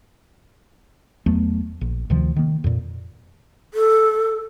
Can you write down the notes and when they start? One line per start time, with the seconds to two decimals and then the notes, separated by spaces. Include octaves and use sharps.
1.26 E2 F#3 A3 B3
1.81 A#1
2.10 D2 C3 D#3 F3
2.36 D#3 A#3
2.64 F2 A#2
3.74 A4